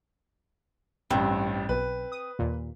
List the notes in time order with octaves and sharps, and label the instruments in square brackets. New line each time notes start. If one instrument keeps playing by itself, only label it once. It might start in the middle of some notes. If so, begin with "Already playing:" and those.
[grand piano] A1 G2 [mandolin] C4
[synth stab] B1 [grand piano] B4
[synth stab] D#6
D#2 A#2